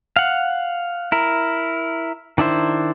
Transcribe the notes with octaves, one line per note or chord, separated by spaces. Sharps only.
F5 F#5
E4 A#4
D#3 D4 E4 C5